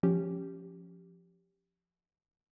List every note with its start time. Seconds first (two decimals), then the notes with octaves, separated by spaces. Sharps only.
0.03 F3 C#4 G4